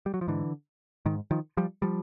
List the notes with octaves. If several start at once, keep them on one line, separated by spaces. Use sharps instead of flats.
G3
F#3
F3
G#2 D3 E3
G#2 D#3
D#3 F3
F3 G3
F3 G3